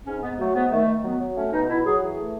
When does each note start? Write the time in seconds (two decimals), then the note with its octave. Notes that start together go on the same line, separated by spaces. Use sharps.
0.06 G#2 C#4
0.22 G#2 B3
0.39 F#3 A3
0.55 G#2 B3
0.71 D#3 A3
0.88 D#3
1.04 F#3 B3
1.21 F#3
1.36 A3 C#4
1.52 B2 D#4
1.69 B2 E4
1.85 F#3 G#4
2.02 E3 G#4
2.18 A3